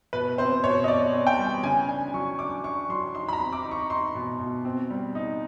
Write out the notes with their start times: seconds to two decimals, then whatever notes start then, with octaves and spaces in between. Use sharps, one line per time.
0.13 B2 B4
0.38 C4 C5
0.64 B2 C#5
0.84 D#5
0.88 B2 D5
1.13 C4
1.27 G5
1.39 G3
1.63 C#3 G#5
1.89 D4 G#5
2.13 F#3 C#6
2.39 D4 D6
2.64 D4 C#6
2.89 F#3 C6
3.15 D#4 C6
3.28 B5
3.33 A#5
3.39 C4
3.53 D6
3.64 D#4
3.71 C#6
3.90 D#4 C6
4.15 B2
4.39 B2
4.65 C4
4.90 G3
5.15 D#4